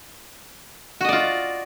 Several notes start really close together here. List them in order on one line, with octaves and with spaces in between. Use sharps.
F#4 D#5 D5 F4